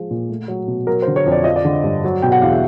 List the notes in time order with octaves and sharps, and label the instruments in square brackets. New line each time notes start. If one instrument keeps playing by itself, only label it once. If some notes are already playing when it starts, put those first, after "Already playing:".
Already playing: [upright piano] F3 G#3
A#2
A3
F#3
B2
F#3 A#4
C5
D3
C#5
F2
D5
F3 D#5
D5
D3
G2
F#3
B2 G5
F#5
E2 F5
E5